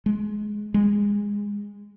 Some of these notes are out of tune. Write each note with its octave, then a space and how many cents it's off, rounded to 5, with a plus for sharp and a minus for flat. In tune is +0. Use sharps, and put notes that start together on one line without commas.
G#3 +15
G#3 -20